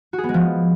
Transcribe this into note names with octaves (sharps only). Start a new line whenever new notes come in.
F#4
G#4
B3
G#3
F3